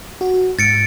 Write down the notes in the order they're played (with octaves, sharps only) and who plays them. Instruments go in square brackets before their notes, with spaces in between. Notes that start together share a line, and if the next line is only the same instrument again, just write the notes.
[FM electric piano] F#4
[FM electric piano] G#2 [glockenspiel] A6 C#7 D7